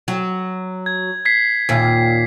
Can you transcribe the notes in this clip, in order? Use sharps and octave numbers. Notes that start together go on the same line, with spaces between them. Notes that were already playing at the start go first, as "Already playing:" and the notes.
F#3
G#6
G#6 B6 C7
D#2 A#2